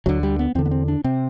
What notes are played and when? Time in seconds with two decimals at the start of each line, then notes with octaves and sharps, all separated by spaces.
0.06 D2 D3 F#3
0.23 G3
0.39 B3
0.55 E2 D3 C4
0.66 B3
0.71 C4
0.88 D4
1.04 C3 C4